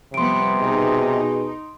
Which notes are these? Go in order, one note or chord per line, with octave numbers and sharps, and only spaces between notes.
C3 F3 G3 B3 C6 D7
B2 D#4 G#4